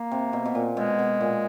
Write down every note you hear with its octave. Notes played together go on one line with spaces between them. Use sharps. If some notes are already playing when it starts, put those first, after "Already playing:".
Already playing: A#3
C3
B2
B2
A#2
B2 G#3
B2
A#2